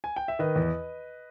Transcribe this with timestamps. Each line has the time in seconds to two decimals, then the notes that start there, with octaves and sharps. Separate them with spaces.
0.04 G#5
0.16 G5
0.28 E5
0.39 D#3 B4 D#5
0.56 E2